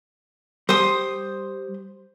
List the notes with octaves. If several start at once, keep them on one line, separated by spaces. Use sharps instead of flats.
G3 C5 D#6